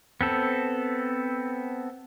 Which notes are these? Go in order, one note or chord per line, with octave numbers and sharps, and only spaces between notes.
B3 C4 A4